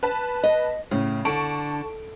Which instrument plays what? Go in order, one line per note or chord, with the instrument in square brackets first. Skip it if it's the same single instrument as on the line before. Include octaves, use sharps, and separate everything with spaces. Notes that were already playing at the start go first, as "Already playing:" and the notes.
[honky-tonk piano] B4 A5
[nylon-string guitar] D#5
[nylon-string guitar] A2 [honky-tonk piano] C#3
[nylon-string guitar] D3 [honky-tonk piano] A5 C#6 D7